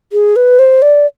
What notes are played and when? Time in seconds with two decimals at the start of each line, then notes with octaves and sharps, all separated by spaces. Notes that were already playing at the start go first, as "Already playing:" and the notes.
0.13 G#4
0.36 B4
0.59 C5
0.82 D5